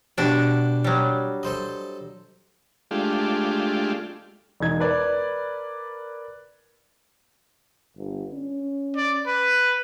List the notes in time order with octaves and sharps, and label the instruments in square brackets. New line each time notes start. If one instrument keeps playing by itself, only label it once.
[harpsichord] B2 G4 [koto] D4 F#4
[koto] F#3 G3
[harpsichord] A4 C5 D#5
[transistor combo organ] G#3 A3 D4 F4 G4
[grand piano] E1 D#4 G#6
A#4 B4 D5
[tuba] G1
C#4
[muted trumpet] D5
B4